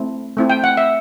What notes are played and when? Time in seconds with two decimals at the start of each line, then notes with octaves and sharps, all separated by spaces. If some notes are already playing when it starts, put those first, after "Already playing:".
Already playing: A3 C4 E4
0.37 A3 C4 E4
0.50 G5
0.64 F#5
0.77 E5